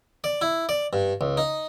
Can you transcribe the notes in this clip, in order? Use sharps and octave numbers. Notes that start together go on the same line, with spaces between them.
D5
E4
D5
G2
C#2
D#4